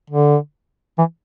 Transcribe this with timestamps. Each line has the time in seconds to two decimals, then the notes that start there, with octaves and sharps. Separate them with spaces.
0.10 D3
0.98 E3